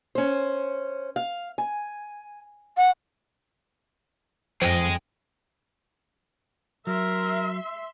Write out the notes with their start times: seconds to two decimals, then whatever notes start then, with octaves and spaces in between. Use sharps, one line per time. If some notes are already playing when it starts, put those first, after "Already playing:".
0.15 C#4 C5
1.16 F5
1.58 G#5
2.77 F#5
4.62 F2 F3 G#4 D#5 G5
6.87 F#3 A#4 E5 C6